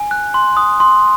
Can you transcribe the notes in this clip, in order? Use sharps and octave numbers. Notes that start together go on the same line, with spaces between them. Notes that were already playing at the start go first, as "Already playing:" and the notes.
Already playing: G#5
F#6
C6
D#6
C6